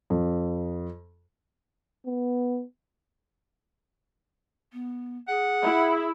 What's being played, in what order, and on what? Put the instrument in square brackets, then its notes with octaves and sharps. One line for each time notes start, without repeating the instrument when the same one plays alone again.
[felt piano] F2
[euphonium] B3
[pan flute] B3
[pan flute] G#4 [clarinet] F#5
[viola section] E4